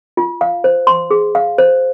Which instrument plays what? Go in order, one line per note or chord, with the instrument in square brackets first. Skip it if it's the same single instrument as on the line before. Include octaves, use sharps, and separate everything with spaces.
[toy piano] F4
F5
C5
C6
G#4
F5
C5